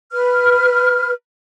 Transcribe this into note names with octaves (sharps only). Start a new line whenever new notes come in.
B4 F6